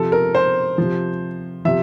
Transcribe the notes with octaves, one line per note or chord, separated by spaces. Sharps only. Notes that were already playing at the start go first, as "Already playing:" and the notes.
Already playing: C3 F3 A4
A#4
C5
C3 F3
C3 F3 E5